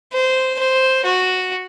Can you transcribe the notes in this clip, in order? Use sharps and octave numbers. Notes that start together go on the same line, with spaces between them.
C5
C5
F#4